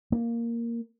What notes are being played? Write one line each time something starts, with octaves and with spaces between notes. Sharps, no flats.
A#3